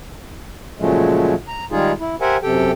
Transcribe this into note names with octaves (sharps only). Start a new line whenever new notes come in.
A#2 C#3 F3 F#3 G#3 A3
A#5
D#3 G3 G#3 D#4 F4 G#4
E4
G4 A#4 C5 E5 F#5 G#5
F#2 C3 G4 A4 G5